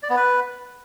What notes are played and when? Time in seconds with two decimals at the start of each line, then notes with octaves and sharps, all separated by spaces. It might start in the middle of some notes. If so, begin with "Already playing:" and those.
0.03 D5
0.10 B3
0.16 B4